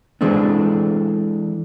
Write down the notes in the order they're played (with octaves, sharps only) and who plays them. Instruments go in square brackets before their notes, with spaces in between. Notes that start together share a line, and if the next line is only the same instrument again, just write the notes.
[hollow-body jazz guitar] E3 G#3 A3 C4 D4